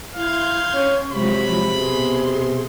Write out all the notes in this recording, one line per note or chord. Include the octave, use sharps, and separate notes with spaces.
E4 F5 C6 G6 G#6
C#4 C#6
C3 F3 F#3 G#3 B5
B2 G#4 C6